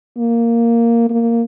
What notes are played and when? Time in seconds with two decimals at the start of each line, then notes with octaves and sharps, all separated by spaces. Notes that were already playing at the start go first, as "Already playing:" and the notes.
0.18 A#3
1.10 A#3